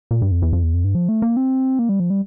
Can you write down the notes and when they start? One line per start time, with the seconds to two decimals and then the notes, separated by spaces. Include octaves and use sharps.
0.11 A#2
0.22 G2
0.31 F2
0.42 E2
0.53 F2
0.63 E2
0.74 F2
0.84 G2
0.95 F3
1.09 A3
1.22 A#3
1.37 C4
1.79 A#3
1.89 G3
2.00 F3
2.10 G3